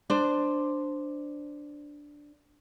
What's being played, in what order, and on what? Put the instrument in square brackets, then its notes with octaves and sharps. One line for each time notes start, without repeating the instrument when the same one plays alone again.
[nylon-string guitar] D4 C5